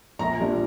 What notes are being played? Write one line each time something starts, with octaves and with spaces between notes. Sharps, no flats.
A#1 A#5
A#2 G3 D4